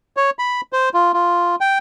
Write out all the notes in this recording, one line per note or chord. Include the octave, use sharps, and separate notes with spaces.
C#5
B5
C5
F4
F4
G5